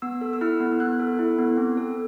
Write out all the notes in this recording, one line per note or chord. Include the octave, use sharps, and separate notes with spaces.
B3 E6
A4
E6
E4 F6
B3
B3 F#6
A4
E4
B3
C4
A4